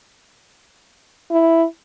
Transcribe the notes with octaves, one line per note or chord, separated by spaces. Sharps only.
E4